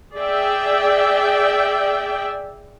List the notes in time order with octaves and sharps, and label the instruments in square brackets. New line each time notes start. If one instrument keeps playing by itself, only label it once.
[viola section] G#4 D5 E5 G5